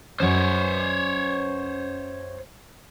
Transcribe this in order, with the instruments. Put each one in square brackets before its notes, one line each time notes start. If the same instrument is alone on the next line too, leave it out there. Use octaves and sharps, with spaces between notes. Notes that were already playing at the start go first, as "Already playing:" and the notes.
[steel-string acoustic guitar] F#2 C#4 [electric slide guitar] C5 C#5